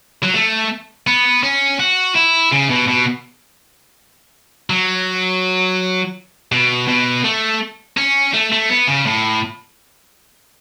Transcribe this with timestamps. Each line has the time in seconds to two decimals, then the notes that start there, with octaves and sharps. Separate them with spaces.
0.23 F#3
0.34 A3
1.07 B3
1.43 C#4
1.80 F#4
2.16 E4
2.53 C#3
2.70 B2
2.88 B2
4.70 F#3
6.52 B2
6.88 B2
7.24 A3
7.97 C#4
8.34 A3
8.52 A3
8.70 B3
8.88 C#3
9.06 A2